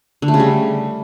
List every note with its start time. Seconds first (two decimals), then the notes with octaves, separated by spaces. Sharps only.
0.22 D3
0.28 A3
0.34 C#3
0.40 G3